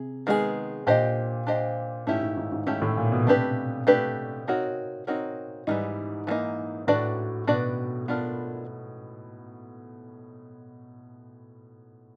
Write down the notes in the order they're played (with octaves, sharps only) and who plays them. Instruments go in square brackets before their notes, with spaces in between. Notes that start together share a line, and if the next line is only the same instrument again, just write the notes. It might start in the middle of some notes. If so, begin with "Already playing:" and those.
Already playing: [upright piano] C3 [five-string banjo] G#4
[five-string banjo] D#3 G#3 B3 D#4 G#4
[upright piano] A#2 [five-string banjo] D4 G4 C5 D#5
[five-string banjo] D4 G4 C5 D#5
[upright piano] G#2 [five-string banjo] A3 C#4 E4 G4
[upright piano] G#2
G#2
G#2
[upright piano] G#2 [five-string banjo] A3 C#4 E4 G4
[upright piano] A2
A#2
B2
[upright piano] C3 [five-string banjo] A3 D4 G4 B4
[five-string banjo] A3 D4 G4 B4
C4 D#4 F#4 A#4 C#5
C4 D#4 F#4 A#4 C#5
[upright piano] G#2 [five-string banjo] E3 G3 A#3 D#4
[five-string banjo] E3 G3 A#3 D#4
[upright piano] A2 [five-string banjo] D4 F#4 B4 D5
[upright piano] B2 [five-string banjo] D4 F#4 B4 D5
[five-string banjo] B3 D4 F4 A#4